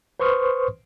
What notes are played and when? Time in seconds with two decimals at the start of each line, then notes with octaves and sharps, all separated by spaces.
0.20 B4 C5 C6 C#6 D#6 F6